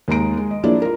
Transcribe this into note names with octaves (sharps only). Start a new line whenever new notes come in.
D#2 G#3 A#5 D7
G#3
D#5
F3 A#3 D4 E4 G#4 D5
F4 A#4